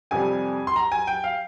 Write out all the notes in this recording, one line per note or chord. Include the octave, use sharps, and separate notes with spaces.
F2 C3 G3 G#5
C6
A#5
G#5
G5
F5